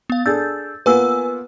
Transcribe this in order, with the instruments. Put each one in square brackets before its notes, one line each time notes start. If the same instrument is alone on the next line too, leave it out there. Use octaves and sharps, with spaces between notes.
[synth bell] B3 F5
[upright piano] D4 G#4 A4 [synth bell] E6 G6 A6
[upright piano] A#3 B3 F4 [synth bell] B4 G#5 E6